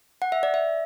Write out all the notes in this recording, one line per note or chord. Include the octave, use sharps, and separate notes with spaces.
F#5
E5
D5
E5